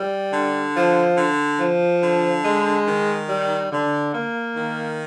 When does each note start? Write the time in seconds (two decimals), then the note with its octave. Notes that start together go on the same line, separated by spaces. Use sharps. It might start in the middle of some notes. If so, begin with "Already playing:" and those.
Already playing: G3
0.32 D3
0.75 F3
1.17 D3
1.60 F3
2.02 D3
2.44 G#3
2.87 D#3
3.29 G3
3.71 D3
4.13 A#3
4.56 D#3